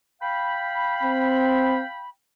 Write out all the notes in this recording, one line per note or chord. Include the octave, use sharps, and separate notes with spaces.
F5 G5 B5
C4